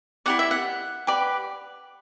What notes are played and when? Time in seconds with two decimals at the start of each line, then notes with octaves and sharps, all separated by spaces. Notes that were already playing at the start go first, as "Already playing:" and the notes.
0.26 E4 G4 D5 F#5
0.39 E5
0.51 F#5
1.07 G4 B4 D5